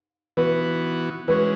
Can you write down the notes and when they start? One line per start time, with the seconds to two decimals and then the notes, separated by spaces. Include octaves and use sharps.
0.37 E3 B3 F#4 B4
1.28 E3 G#3 C#4 F#4 B4